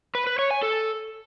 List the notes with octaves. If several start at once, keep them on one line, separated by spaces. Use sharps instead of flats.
B4
B4
C#5
G#5
A4